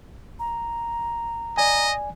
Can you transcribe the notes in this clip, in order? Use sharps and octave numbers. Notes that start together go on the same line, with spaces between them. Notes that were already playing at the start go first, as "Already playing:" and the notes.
A#5
D5 D#5 G#5